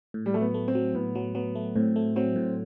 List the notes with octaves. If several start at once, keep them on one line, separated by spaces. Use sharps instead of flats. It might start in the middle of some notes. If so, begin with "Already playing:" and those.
A2
G3
F#3 A3
B3
A3
C4
F#3
A2 B3
F#3
F#3 B3
A3
A2 C4
A3
F#3 C4
A2